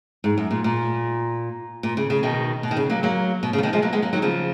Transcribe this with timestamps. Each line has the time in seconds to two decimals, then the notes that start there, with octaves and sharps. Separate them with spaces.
0.24 G#2
0.38 F#2
0.51 A#2
0.64 A#2
1.83 A#2
1.97 C#3
2.10 C#3
2.23 B2 D#3
2.63 B2
2.71 D#3
2.77 C#3
2.90 F#3 A#3
3.03 F#3 A#3
3.43 B2
3.53 C#3
3.58 F3
3.63 B2 D#3
3.73 F3 G#3
3.82 F#3 A#3
3.93 G#3 B3
4.02 F#3 A#3
4.13 D#3 F#3
4.22 C#3 F3